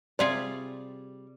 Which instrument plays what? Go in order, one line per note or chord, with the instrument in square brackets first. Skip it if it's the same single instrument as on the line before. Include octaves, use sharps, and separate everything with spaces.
[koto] C3 F4 G#4 [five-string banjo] G3 D5